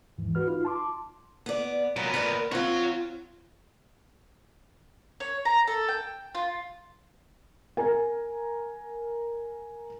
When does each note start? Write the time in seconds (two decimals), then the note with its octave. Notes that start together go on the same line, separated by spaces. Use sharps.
0.18 D#2 G#2 E3
0.35 F#4 B4 F6
0.48 D#4 F4
0.65 A5 C6 D6
1.46 B3 D5
1.96 A#2 F#3 B3
2.14 A#4 B4 D5
2.51 C4 F4 C#5 F#5
5.20 C#5
5.45 A#5
5.67 A4
5.88 G5
6.35 F4
7.77 A#4 G#5